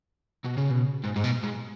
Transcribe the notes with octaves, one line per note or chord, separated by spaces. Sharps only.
B2
C#3
B2
G#2
G#2
B2
G#2